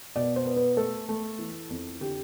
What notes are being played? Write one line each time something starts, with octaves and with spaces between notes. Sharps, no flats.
B2 D5
C5
B3
B4
A3 A4
A3
E3
F2
D3 G4